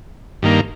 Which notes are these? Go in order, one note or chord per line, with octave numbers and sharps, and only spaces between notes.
G2 D#3 A#3